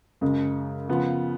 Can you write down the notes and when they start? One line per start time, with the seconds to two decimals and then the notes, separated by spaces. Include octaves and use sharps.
0.21 F#2 C#3 G#3
0.89 C#3 F3 B3 F4